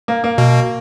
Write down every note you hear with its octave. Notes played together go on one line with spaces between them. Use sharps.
A#3
A#3
B2